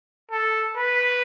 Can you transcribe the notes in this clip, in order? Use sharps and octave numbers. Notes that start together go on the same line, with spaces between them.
A4
B4